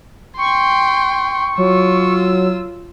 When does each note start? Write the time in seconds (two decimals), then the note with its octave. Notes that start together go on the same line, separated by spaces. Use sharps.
0.38 G5 C6 C#6
1.58 F#3 F4 E6